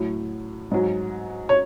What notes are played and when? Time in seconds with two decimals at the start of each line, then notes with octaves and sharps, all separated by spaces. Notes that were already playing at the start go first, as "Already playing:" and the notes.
Already playing: A2 F#3
0.71 G#2 F#3
1.49 C#5